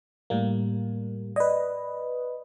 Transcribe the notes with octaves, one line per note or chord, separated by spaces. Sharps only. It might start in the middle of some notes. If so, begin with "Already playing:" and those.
A2 G3 A#3
B4 D5 D#5